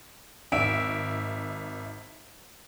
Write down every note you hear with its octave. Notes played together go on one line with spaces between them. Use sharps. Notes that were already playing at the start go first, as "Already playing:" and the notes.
G#1 E5 D7